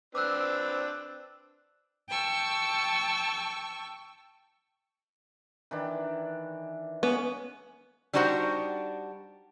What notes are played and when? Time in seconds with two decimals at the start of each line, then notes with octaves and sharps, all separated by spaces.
0.15 C4 D4 B4 D6 E6 F#6
2.09 G5 A5 C#6 E6
5.71 D#3 E3 D4
7.03 B3 C#4
8.13 G3 D4 D#4 F#4 C5 F#5